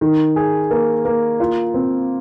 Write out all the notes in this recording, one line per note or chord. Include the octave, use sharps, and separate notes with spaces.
D#3
G#4
A#3
A#3
F4
C4